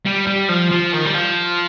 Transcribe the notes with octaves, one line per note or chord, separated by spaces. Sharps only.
G3
G3
F3
F3
D#3
G3
F3